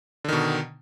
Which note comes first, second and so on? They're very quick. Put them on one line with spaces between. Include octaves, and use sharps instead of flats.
D3 D#3 B2